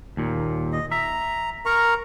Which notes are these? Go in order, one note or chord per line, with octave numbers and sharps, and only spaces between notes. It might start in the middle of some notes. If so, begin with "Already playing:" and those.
D#2 A#2
D#5
E5 A#5
A#4 A#5 C#6